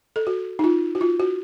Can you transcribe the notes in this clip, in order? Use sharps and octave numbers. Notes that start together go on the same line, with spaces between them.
A4
F#4
D#4
F4
F#4
F4
F#4